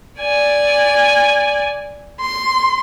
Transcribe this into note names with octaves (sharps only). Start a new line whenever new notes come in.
D5 G#5
C6